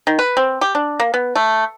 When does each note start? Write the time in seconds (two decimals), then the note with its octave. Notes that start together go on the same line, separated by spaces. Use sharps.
0.07 D#3
0.19 B4
0.37 C4
0.61 G4
0.75 D4
1.00 A#3
1.14 B3
1.35 A3